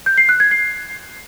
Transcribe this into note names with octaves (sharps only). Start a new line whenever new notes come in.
G6
C7
F#6
G#6
C7